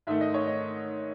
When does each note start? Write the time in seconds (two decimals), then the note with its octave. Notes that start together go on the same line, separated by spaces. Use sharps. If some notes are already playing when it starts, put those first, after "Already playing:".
0.07 G#2 D#3 A3 E5
0.21 D#5
0.34 C#5
0.47 D#5